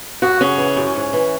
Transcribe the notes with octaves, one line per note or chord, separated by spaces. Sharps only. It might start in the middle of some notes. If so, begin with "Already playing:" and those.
F#2 F#4
C#3 C#4
E3
F#2
G#2
E3